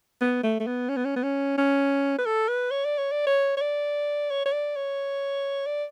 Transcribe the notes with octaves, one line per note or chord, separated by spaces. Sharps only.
B3
A3
A3
B3
C#4
B3
C#4
B3
C#4
C#4
B4
A4
B4
C#5
D5
C#5
D5
C#5
C#5
D5
C#5
C#5
D5
C#5
D5